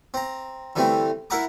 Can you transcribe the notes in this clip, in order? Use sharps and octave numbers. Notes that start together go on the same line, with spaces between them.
C4 A#5
D3 E3 G3 A3 C4
E4 A#4 E5 F#5 A#5 D6